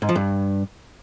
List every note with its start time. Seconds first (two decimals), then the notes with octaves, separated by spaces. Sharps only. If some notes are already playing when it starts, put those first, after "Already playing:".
0.02 G#2
0.09 F3
0.15 G2